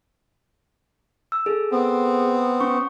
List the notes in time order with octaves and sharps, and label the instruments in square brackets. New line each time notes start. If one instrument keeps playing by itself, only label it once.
[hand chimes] E6
G#4 A4
[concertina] B3 C4
[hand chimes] C#4 C#6